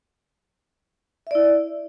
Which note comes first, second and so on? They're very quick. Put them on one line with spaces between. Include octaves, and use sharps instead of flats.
E5 D5 E4